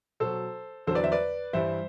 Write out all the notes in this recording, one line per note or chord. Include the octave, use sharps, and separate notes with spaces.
B2 F#3 A4 C5
E2 D3 F#3 A4 C5
B4 D5
C5 E5
B4 D5
G2 E3 G3 C5 E5